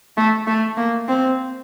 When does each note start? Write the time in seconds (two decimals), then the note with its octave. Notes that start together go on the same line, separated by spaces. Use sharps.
0.17 A3
0.47 A3
0.77 A#3
1.08 C4